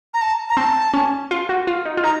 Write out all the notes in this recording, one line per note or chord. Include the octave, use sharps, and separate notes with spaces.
A#5
A5
A#5
C4 A5
C#4
F4
F#4
F4
D#4
F4
D#4 A#5